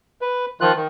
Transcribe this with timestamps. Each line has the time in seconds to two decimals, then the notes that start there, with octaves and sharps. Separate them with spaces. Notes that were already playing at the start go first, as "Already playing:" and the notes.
0.21 B4
0.61 D#3 F3 F4 F#6
0.76 D#3